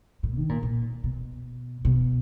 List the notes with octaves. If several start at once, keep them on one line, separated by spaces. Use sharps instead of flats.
A2
D#3
A#2
A#2
B2
B2